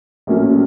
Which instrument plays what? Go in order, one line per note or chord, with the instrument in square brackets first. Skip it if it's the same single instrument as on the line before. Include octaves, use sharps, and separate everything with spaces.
[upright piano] A#1 A2 F#3 A#3 C#4